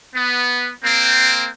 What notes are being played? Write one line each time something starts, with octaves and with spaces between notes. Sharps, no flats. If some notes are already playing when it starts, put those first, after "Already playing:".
B3
A#3 C4